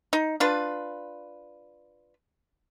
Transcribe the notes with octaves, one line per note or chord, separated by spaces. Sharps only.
D#4
D4 F4 B4